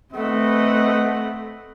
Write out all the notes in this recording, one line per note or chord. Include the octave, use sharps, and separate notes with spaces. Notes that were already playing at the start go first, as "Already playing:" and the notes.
A3 C4 B4 D#5 F#5